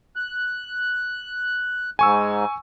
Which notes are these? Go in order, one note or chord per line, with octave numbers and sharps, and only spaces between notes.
F#6
G#2 G#5 C#6 E6